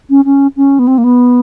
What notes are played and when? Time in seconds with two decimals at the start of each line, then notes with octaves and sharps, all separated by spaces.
0.10 C#4
0.25 C#4
0.57 C#4
0.79 B3
0.87 C4
0.98 A#3
1.04 B3